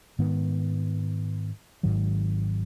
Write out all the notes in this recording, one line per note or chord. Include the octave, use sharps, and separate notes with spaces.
G#2 D#3 B3
G#1 G#2 D#3 F#3